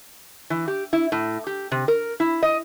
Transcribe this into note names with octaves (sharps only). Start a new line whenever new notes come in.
E3
G4
E4
A2
G4
C3
A#4
E4
D#5